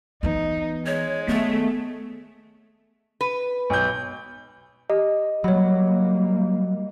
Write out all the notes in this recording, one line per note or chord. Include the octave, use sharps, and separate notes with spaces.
E3 B3 D#4
G#3 C#5
D#3 A3 B3
B4
B1 G6
G4 D#5
F#3 G3 A#3 C#5 B5